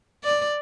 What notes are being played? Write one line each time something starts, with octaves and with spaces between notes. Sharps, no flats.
D5